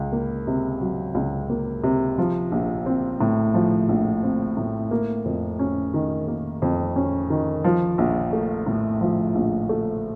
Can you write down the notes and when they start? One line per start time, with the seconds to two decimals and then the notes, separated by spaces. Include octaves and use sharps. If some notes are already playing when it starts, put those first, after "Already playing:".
Already playing: C#2
0.12 A#3
0.47 C3
0.81 F#3
1.15 C#2
1.50 A#3
1.84 C3
2.18 F3
2.52 A#1
2.86 C4
3.21 A2
3.54 F3
3.89 A#1
4.23 C4
4.57 A2
4.91 A#3
5.25 F2
5.59 C#4
5.94 D#3
6.28 A#3
6.62 F2
6.96 C#4
7.30 D#3
7.64 F3
7.98 A#1
8.33 A3
8.66 A2
9.01 F3
9.35 A#1
9.69 A3